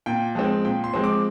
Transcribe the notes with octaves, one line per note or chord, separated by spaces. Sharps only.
A#2 G5
F3 G#3 C4
A#2 G5
C6
F3 G#3 C4
D6